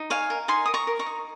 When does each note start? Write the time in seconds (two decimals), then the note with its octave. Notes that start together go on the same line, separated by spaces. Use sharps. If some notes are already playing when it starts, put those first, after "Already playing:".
Already playing: D#4
0.10 C#5 F5 G#5
0.30 A#4
0.48 D#4 G#5 C6
0.65 A#4 D#6
0.74 A#5 C#6
0.87 A#4
0.99 A#5 C#6
1.06 D#4